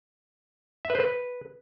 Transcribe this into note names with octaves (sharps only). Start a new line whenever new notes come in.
E5
B4
C5
B4